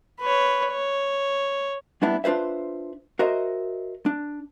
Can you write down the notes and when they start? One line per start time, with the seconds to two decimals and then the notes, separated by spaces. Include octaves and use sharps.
0.20 B4 C#5
0.71 C#5
2.02 G3 A#3 B3 D4 E4
2.24 D4 F4 B4 C5 E5
3.19 F#4 A#4 C5 D#5 E5
4.06 D4